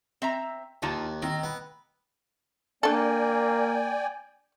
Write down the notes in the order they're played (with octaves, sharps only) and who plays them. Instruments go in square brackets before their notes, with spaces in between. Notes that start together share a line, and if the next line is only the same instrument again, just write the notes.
[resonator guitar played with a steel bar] C4 E5 A#5
[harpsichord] D#2 [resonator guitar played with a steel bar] D#4 F4 A5
[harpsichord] D#3 [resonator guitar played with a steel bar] C4
[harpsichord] B3
[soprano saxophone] A#3 [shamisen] D4 A4 [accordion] D5 G5 G#5